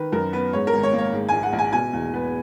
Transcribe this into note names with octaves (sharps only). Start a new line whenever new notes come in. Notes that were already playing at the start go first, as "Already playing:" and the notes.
Already playing: D#3 B4
F#2 A#4
B3 B4
G#2 C#5
A#4
G#1
C#5
A#3
C#5
G#2
A#1 G#5
F#5
A#1
G#5
B2 G#5
E2
B3 B4